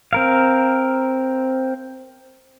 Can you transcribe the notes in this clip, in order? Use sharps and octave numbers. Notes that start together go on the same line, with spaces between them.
C4 A#4 F5